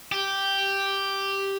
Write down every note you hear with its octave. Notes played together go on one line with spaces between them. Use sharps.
G4